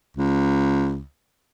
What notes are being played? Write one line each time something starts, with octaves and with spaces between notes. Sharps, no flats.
C#2